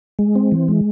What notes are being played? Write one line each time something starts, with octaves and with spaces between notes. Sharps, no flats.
G#3
C4
E3
G#3